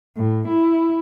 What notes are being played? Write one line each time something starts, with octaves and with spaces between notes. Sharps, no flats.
A2
E4